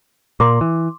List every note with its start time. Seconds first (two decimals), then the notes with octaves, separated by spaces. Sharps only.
0.40 A#2 A#3 C6 D6
0.61 E3